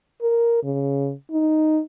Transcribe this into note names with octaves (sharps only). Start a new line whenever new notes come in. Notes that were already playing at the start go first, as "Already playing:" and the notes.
A#4
C#3
D#4